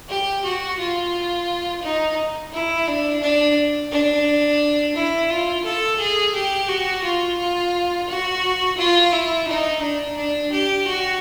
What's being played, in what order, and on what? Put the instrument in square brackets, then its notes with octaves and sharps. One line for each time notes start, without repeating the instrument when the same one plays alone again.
[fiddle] G4
F#4
F4
D#4
E4
D4
D4
D4
E4
F4
A4
G#4
G4
F#4
F4
F4
F#4
F4
E4
D#4
D4
D4
G4
F#4